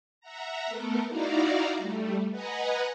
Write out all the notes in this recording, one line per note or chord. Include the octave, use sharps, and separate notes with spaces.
E5 F#5 A#5
A3 B3 A4 A#4
D#4 E4 F#4 D5 F5 A#5
G3 A3
B4 D#5 F#5 G#5 A#5